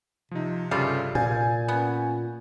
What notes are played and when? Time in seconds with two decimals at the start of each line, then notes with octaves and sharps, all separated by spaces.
0.31 C3 F3 D#4
0.71 G2 C#3 G3 F4 A4
1.15 A#2 G#5 G6 A6
1.68 B3 C#4